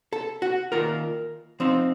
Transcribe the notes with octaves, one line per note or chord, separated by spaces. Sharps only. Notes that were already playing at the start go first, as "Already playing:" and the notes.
A4
F#4
D#3 A#3 F4 A#4
F3 C4 D#4